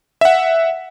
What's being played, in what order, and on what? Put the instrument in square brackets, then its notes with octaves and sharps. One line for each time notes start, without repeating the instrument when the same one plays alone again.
[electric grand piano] E5 F#5